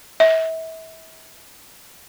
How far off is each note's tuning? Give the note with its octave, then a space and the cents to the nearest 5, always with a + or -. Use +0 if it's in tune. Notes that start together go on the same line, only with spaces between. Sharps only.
E5 -35